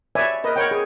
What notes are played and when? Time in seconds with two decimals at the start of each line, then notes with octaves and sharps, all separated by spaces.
0.15 B4 C#5 D5 E5 G#5
0.44 A#4 B4 D#5
0.56 A#4 C#5 F#5 G5
0.71 G#4